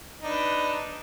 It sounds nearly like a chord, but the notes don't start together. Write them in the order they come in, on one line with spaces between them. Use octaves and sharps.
D#4 D4 B4